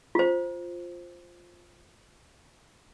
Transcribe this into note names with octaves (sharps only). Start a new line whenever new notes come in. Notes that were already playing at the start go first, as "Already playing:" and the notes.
F4 C5